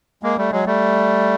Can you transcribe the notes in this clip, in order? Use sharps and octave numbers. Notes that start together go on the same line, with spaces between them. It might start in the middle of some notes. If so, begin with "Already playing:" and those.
G#3 A#3
G3 A3
F#3 G#3
G3 A3